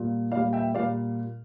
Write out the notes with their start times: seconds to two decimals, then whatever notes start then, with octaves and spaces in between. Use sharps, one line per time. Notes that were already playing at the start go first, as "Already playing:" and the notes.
Already playing: A#2 G3
0.31 A#2 D5 F5
0.36 G3
0.53 E5 G5
0.74 A#2 G3 D5 F5